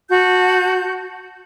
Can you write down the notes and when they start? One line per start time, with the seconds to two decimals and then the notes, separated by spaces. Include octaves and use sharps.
0.09 F#4 A5 G6